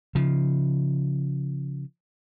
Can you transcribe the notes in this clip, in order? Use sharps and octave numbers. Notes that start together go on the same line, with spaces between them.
C#3 F3